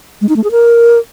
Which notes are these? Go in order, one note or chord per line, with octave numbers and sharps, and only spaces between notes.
G#3
D#4
A3
G#4
A#4